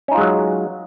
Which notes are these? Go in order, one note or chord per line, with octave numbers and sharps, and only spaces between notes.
F#3 G#3 C#4 D#4 F4